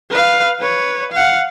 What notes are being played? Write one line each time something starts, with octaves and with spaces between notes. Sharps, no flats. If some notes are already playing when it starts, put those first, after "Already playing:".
B4 F5
B4 C#5
F5 F#5